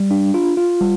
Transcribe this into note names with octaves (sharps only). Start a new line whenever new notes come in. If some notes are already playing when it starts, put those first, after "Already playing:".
Already playing: G3
D4
F4
F4
G3